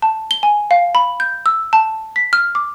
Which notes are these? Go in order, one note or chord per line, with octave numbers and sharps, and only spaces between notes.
A5
G7
G#5
F5
B5
G6
E6
A5
B6
F6
D6